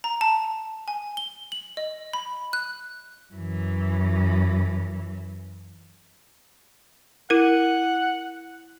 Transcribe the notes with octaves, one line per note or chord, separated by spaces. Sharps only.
A#5
A5
G#5
G7
F#7
D#5
B5
F#6
F#2 E3
E4 A#4 F#5